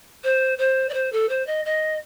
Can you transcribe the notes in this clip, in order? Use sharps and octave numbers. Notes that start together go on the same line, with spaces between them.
C5
C5
D5
C5
A4
C5
D#5
D#5